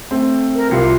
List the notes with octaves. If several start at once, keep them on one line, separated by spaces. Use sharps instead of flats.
A3 C4
A#4
C2 F4 G4 C#7